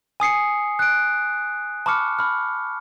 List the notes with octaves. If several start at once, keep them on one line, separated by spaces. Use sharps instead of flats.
G#5 D#6 C7 C#7
F#6 D7
A5 B5 C#6 D6 F6 C#7
B5 F6